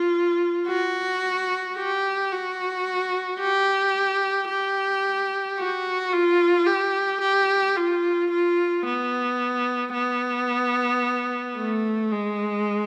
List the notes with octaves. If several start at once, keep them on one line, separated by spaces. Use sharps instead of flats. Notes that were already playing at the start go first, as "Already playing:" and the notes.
Already playing: F4
F#4
G4
F#4
G4
G4
F#4
F4
G4
G4
F4
F4
B3
B3
A3
G#3